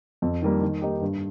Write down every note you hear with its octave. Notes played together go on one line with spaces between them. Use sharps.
F2
D#3 G3 A#3
D#3
A#3 D#4 G4
G2